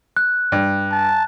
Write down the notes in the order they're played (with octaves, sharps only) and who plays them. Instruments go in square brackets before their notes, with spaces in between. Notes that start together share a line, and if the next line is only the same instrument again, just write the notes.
[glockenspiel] F#6
[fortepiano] G2
[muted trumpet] A5